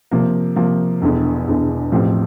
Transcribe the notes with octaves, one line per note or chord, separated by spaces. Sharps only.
C3 F3 A#3
C3 F3 A#3
E1 E2 D3
E1 E2 D3
A1 A2 F3 C4 G4